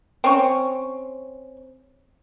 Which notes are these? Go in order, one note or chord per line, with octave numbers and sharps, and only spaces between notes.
C4 C#4 C#6